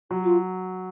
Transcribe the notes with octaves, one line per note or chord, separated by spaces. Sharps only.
F#3 F#4
F4